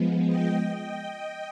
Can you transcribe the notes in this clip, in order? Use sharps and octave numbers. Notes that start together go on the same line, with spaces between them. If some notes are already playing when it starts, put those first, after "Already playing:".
Already playing: F3 G#3 B3
D#5 G5
D#5 G5